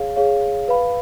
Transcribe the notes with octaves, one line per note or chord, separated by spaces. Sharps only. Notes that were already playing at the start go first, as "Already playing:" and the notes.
Already playing: G#4 C#5 F5
G#4 C#5 F5
B4 F5 B5